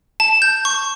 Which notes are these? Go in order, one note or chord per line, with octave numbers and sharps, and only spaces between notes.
A5
G6
C#6